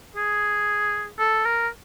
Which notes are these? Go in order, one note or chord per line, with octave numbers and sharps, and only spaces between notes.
G#4
A4
A#4